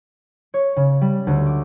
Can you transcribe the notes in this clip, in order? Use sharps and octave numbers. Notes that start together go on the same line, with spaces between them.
C#5
C#3
G3
D2
D6